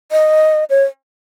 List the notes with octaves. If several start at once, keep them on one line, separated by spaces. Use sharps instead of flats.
D#5
C#5